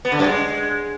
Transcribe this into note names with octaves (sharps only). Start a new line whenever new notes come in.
B3
D3
F#2
G#3